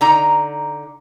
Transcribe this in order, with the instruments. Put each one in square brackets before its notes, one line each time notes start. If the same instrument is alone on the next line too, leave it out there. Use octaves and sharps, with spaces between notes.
[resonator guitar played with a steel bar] D3 D#4 A#5